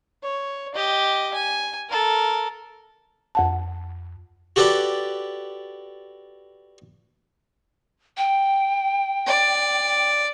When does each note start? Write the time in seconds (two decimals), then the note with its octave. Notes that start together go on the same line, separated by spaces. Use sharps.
0.23 C#5
0.75 G4 D#5
1.34 G#5
1.89 A4 A#4
3.35 F2 F#5 A5
4.56 F#4 G4 A4 B4 D5
8.17 G5
9.27 D5